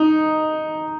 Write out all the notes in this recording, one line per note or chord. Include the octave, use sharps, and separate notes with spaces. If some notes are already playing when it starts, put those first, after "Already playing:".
Already playing: D#4